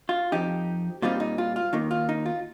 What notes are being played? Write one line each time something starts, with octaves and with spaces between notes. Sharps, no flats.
F4
F2 F3 D#4 G4
A#2 G3 C4 D#4 F4
D#4
F4
F4
D#2 D#3 A#3 D#4
F4
D#4
F4